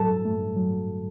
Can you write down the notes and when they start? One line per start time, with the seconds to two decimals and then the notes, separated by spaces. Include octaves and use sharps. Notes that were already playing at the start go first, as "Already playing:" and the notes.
Already playing: A2 F#3 A4 A5
0.09 G2
0.25 A3
0.40 G2
0.56 F#3